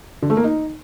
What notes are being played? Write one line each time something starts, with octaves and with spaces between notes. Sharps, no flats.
D3
A3
A#3
D#4